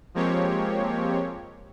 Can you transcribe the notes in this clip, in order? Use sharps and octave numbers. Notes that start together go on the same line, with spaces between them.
F3 G#3 A#3 C4 G4 C#5